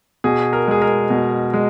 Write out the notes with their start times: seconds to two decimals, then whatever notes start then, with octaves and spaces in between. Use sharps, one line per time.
0.24 B2 G#4
0.53 A#4
0.68 G#3 G#4
0.82 A#4
1.10 B2
1.53 G#3